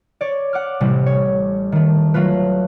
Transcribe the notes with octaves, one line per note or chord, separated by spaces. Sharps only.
C#5 D5
F#5 D6 F6
A1 C3 G3
C#5
D#3 A3
F#3 A3 F4 B4